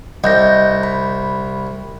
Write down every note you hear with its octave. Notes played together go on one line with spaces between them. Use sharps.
C2 D#5 G6 A#6
B5